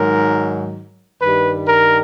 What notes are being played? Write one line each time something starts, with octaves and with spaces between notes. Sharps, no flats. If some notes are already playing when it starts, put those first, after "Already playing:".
Already playing: G#2 D#3 F#3 A#4
G2 D#3 G3 B4
A#4